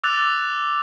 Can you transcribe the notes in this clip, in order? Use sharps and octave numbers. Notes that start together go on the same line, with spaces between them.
D6 E6 F#6 A6 F7